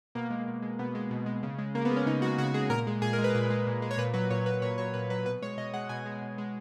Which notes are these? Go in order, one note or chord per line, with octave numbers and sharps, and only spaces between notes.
B2 A#3
G#3
B2
G#3
B2 B3
G#3
B2
G#3
C#3
G#3
C#3 A#3
B3
G#3
C#4
C#3 D#4
G#3 F#4
C#3 F#4
G#3 G#4
A#2 A#4
G#3
A#2 G#4
A#4
G#3
B4
A#2 B4
G#3
A#2
G#3
C#5
A#2 B4
F#3 B4
A#2 C#5
F#3 B4
A#2 C#5
F#3 C#5
A#2 B4
F#3 B4
B2 B4
G#3 C#5
B2 D#5
G#3 F#5
B2 G#5
G#3
B2
G#3